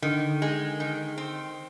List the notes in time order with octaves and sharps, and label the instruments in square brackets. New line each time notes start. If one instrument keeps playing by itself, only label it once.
[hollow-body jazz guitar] D3 [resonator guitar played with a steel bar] D#3
[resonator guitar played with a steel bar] G#3
D#3
C4